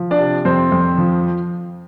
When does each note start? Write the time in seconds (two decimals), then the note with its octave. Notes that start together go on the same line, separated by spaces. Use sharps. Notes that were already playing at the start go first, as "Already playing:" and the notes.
Already playing: F3
0.11 D4 D5
0.19 C3
0.45 F2 C4 C5
0.72 F2
0.98 F3